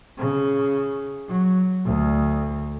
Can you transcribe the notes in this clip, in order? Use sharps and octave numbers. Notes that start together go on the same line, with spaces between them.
C#3
F#3
D2